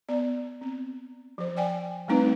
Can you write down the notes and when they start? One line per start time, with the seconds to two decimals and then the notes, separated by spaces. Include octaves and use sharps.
0.09 B3 D5
0.61 C4
1.38 F3 C5
1.57 D5 G5 G#5
2.08 G3 A3 C4 D#4 B4